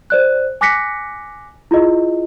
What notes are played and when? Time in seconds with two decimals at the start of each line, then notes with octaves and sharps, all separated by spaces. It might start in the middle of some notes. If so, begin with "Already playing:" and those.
0.10 C5 D5 F#6
0.61 G#5 D6 F#6 A#6 B6 C#7
1.71 E4 F4 G#4 D#5